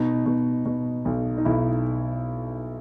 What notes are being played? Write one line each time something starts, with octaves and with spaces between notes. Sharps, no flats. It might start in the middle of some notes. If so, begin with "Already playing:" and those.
Already playing: B2 D#4
B2
B2
B1
D#4
B1 E4